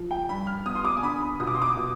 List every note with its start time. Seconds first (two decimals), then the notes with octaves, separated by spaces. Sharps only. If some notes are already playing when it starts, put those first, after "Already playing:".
Already playing: F3
0.11 G5
0.29 G2 B5
0.47 F6
0.65 B3 D#6
0.75 C6
0.85 D6
0.97 G#5
1.03 D3 B5
1.21 B5
1.40 B2 D#6
1.47 D6
1.55 C6
1.62 D6
1.77 B2